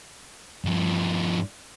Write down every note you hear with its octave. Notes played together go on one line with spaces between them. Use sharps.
G2 F3